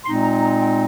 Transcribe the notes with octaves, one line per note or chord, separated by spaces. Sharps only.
A#2 G#3 C4 D#4 C6
A#5
A#5
G5